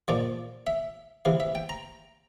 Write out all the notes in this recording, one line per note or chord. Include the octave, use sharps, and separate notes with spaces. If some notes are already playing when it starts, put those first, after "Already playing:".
A#2 F3 D5
E5
C3 E3 F5
E5
G5
A#5